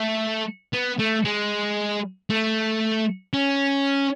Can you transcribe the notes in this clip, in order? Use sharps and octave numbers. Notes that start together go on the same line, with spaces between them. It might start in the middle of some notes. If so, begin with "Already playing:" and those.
Already playing: A3
B3
A3
G#3
A3
C#4